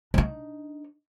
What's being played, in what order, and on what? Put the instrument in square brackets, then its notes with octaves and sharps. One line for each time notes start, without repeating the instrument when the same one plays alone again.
[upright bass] D4 D#4